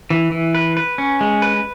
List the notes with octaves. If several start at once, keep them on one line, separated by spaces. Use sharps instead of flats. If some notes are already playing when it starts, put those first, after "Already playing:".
E3
E3
B4
B4
C#4
G#3
B4